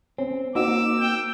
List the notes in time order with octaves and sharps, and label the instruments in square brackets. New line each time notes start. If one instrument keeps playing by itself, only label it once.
[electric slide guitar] C4 [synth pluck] C#4
[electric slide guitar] A#3 [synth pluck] C4 D#4 F#4 [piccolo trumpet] D6 [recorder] E6
[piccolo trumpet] G5